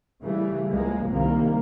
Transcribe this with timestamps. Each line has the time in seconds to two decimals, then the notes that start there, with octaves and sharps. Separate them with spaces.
0.23 C#3 E3 G3 A3
0.70 C#2 F3 G#3 A#3
1.08 C2 C3 D#3 G3 A#3